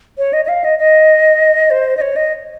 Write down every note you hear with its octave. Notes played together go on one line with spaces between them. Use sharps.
C#5
D#5
D#5
F5
D#5
D#5
C5
D#5
C#5
D#5